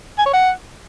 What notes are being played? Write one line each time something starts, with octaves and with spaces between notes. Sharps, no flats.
G#5
C#5
F#5